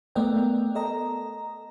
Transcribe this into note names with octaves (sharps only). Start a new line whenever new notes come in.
A3 B3 A#4 D5 D#5 G5
A4 D#5 A#5